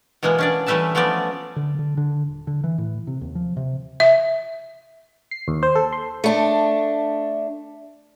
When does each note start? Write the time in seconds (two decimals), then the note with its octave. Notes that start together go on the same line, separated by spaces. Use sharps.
0.23 B2 E3 G#3 A#3 B3
0.38 C#4 D4 D5
0.66 E3 G3 A3 B4 E5 A5
0.95 F3 A3 B3 C#4 D5
1.56 D3
1.79 D3
1.97 D3
2.28 D#1
2.47 D3
2.64 E3
2.78 A2
3.07 C3
3.21 D#2
3.35 F3
3.57 C3
4.00 E5
5.31 C7
5.48 D#2
5.63 C5
5.75 A4
5.92 C6
6.24 A3 D4